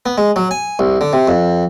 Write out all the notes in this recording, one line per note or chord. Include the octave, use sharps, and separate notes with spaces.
B3
G#3
F#3
G#5
C2
D3
C3
F2